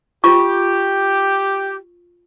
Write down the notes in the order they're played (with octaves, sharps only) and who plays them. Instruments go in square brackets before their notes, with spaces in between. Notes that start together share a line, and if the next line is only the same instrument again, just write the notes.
[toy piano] F4 C#6 [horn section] G4